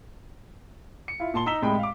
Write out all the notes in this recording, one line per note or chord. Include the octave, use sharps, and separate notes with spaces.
C#7
E4 F4
A#2 A5 C6 G7
D#4 A#5 E6 B6 E7 G7
C2 A2 G#3 D#5 G5 B5
F5 D6